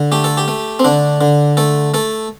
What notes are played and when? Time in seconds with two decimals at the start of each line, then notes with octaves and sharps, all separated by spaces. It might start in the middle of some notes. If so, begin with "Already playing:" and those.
Already playing: D3
0.12 A3 G4
0.24 A4
0.37 G4
0.48 A3
0.79 C4
0.85 D3 D4
1.21 D3
1.57 A3 A4
1.94 A3 A4